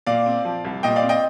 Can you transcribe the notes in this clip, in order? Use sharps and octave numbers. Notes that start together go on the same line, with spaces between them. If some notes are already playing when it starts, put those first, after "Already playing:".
A#2 D5 F5
C4
F3
C2
A#2 D#5 G5
D5 F5
C4
D#5 G5